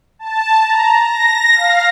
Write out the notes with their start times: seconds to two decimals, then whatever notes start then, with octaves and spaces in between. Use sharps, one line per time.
0.19 A5
0.63 A#5
0.98 A#6
1.55 F5